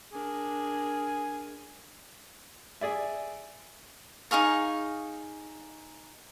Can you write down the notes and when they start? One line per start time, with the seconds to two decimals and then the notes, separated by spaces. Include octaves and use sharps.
0.12 D4 G#4 A#4
2.81 G#4 D5 E5
4.31 D#4 G#4 F5 C#6